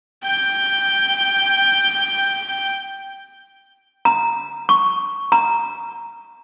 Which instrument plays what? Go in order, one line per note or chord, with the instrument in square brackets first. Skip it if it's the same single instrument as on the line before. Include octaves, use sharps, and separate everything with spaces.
[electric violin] G5 G6
[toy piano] A#5
C#6
A#5